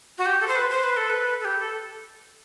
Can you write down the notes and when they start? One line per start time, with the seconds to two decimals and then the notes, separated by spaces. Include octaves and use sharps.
0.18 F#4
0.26 G4
0.41 A4
0.48 C5
0.56 B4
0.70 C5
0.84 B4
0.97 A4
1.10 B4
1.40 A4
1.45 G4
1.59 A4